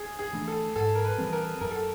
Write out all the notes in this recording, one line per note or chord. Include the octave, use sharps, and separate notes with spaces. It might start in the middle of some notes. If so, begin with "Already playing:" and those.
Already playing: G#4
G#4
E3 A3 D4
A4
G#2 A4
A#4
B4
E3 G3 C4
A#4
F#2 A#4
A4